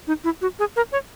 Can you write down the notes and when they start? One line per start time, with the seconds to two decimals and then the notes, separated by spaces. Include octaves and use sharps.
0.07 D#4
0.24 E4
0.41 F#4
0.59 G#4
0.76 A#4
0.92 C#5